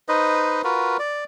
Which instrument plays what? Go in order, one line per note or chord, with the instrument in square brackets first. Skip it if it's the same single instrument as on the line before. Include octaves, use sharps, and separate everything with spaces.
[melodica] D#4 B4 C5 D#5
F4 F#4 A#4 B4
D5